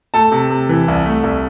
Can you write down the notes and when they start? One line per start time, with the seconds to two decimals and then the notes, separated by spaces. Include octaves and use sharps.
0.14 A3 A4 A5
0.32 C3
0.50 C3
0.69 E3
0.88 C2
1.06 A3
1.23 C2